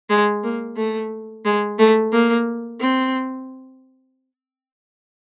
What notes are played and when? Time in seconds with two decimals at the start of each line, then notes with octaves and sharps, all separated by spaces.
0.10 G#3
0.43 A#3
0.76 A3
1.45 G#3
1.79 A3
2.12 A#3
2.81 C4